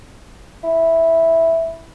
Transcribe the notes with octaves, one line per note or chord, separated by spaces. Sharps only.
E4